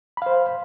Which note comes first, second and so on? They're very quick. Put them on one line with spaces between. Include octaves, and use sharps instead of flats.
B5 F5 C5